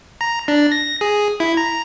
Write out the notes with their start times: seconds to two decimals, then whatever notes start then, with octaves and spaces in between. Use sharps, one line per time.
0.21 A#5
0.48 D4
0.72 A#6
1.01 G#4
1.40 E4
1.57 A#5